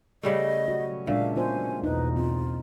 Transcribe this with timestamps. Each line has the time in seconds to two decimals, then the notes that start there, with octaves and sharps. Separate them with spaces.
0.23 C#3 G3 A3 D#5
0.68 F#3 C#4 F#4
1.07 A#2 G#3 D4 E5 F5
1.36 B3 F4 C5 G#5
1.84 B1 E2 D#4 B4
2.16 C4 F4